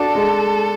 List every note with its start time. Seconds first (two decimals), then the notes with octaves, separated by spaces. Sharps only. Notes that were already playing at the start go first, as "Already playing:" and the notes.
Already playing: D4 F#4 A4
0.15 G#3